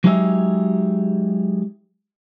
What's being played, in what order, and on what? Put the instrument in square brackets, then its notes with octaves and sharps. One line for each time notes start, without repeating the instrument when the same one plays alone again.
[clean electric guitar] F#3 G#3 D#4 G4 G#4 E5